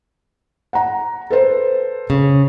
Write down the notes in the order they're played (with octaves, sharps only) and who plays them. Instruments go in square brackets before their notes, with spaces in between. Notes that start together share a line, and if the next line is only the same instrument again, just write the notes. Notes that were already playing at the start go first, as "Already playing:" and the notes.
[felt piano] F#5 A#5
A4 B4 C5
[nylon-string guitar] C#3